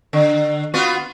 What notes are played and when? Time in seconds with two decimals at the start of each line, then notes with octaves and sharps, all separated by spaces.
0.13 D3
0.74 B3 F4 F#4